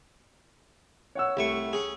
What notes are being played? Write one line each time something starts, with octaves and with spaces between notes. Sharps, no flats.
C#5 F#5 E6
C2 A3 C#6
C#4 G#4